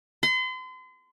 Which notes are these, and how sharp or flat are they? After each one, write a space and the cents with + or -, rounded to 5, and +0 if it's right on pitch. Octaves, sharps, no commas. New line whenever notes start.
C6 -40